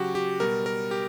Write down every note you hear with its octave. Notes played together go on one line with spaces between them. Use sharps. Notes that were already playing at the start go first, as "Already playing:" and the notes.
Already playing: C#3 F#3 F#4 G4
G4
B2 G3 A#4
A#4
G4